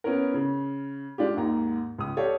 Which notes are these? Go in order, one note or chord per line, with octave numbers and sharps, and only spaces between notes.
B3 C#4 E4 A#4
C#3
G#3 D4 F4 G4
D#2 G#2 A#5
C#2 D#6
G4 A4 C#5 D5 F5